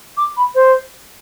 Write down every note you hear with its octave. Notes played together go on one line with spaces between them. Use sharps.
D6
B5
C5